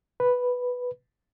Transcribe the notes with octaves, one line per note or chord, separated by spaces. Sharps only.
B4